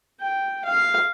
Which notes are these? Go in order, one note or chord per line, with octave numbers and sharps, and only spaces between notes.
G5
F5